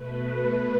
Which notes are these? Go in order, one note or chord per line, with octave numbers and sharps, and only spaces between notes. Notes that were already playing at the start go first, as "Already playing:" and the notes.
Already playing: B2 A3 B4